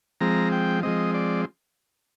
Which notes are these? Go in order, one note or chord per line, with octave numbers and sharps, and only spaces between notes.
F3 G#3 C4 A#5
G5
F3 G#3 C4 D#5
D5